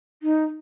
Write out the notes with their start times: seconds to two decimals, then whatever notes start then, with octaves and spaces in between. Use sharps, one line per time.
0.23 D#4